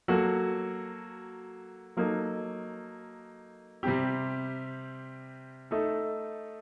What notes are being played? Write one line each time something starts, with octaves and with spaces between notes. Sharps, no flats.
F#3 A#3 F#4 A4
F#3 A#3 D#4 A4
C3 G3 C4 G4
A3 D#4 A4